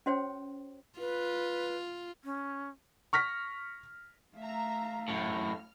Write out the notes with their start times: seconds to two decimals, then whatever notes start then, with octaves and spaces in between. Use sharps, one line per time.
0.06 C#4 F#4 C5 C#5 G5
0.99 F4 B4
2.23 C#4
3.13 C#6 F6 A#6 B6
4.37 A3 E5 F5 A#5
5.08 F#2 A2 F6